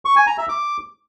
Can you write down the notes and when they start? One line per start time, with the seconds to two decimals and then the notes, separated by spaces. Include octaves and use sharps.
0.05 C#6
0.16 G#5
0.27 A#5
0.38 E5
0.49 D6